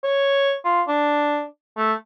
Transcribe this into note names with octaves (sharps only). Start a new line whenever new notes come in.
C#5
F4
D4
A3